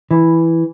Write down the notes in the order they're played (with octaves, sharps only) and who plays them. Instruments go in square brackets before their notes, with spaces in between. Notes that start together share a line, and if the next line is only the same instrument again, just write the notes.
[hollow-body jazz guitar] E3